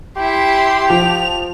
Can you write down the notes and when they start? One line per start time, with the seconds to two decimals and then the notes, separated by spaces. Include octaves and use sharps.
0.17 E4 G4 C6
0.90 F3 F7